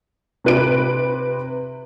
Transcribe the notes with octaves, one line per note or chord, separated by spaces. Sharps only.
C3 B4 D7